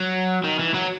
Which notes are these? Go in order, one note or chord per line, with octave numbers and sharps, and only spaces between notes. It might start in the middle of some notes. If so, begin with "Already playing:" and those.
Already playing: F#3
D#3
E3
F#3